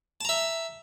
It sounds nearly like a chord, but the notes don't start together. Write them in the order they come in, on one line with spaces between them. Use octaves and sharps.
A5 A#5 E5